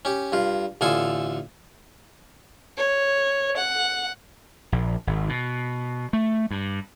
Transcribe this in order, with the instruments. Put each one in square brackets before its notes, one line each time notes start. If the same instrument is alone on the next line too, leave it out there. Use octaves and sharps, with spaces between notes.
[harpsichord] C#4 G4
G2 F4
A1 D3 F4 A4 G#5 D#6
[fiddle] C#5
F#5
[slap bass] A#1
G#1
B2
A3
G2